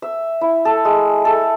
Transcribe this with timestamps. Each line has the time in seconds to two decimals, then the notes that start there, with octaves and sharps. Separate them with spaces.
0.02 E5
0.41 E4
0.65 A4
0.85 G#3
1.25 A4